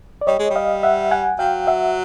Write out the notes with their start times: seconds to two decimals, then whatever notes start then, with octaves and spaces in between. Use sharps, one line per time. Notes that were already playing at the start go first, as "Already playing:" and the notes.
0.21 D5
0.27 G3 C#5 D#5
0.39 G#3
0.50 G3
0.56 D#5 F5
0.83 E5 F#5
1.11 F#5 G#5
1.39 F#3 F5 G5
1.67 E5 F#5